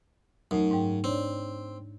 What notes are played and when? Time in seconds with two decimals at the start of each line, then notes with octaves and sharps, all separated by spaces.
0.51 F#2 A3 D#4
0.71 G#2 G5
1.04 C4 D4 C#5 D5